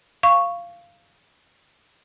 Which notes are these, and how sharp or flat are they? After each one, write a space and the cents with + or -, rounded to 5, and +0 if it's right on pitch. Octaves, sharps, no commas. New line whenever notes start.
F5 -10 C#6 +0